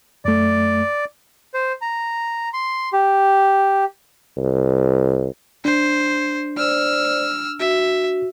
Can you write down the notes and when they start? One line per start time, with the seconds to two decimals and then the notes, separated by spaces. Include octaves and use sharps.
0.25 F#2 A3 D5
1.54 C5
1.81 A#5
2.53 C6
2.93 G4
4.37 C2
5.65 D4 C5
6.57 C5 D5 E6 F6
7.60 F#4 E5